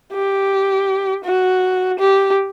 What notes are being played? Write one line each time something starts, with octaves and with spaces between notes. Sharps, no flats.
G4
F#4
G4